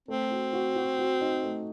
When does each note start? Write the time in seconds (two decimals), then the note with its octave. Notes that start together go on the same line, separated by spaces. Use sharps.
0.08 A3 C4
0.31 F#4
0.53 F#4
0.76 F#4
0.99 F#4
1.21 D#4
1.43 A3